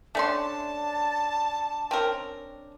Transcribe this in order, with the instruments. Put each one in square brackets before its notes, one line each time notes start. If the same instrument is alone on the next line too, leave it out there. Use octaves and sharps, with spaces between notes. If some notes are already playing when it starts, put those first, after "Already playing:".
[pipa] A3 C#4 C6 [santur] D4 [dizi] A5
[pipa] C4 C#4 A#4